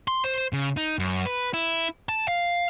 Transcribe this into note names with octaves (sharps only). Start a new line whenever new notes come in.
C6
C5
C#3
D#4
F#2
B4
E4
A5
F5